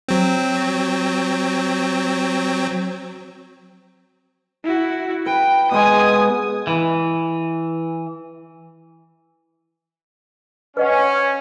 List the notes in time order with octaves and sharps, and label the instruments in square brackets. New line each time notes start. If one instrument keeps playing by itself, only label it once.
[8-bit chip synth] F#3 C4
[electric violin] E4 F#4
[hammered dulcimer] B4 [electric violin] G5
[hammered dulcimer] B2 G#3 [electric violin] G#5 D#6
[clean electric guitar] E3
[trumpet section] C#4 [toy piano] B4 D#5 F#5